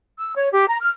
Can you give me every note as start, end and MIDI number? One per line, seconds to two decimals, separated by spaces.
0.18 0.32 88
0.36 0.50 73
0.51 0.65 67
0.67 0.77 82
0.80 0.90 89